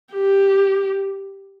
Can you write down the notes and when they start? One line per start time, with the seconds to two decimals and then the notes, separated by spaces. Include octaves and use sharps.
0.13 G4